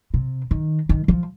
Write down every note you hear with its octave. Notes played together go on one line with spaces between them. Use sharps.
C3
D#3
D#3
F3